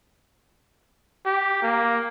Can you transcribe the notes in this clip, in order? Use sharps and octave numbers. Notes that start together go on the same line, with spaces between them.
G4
A#3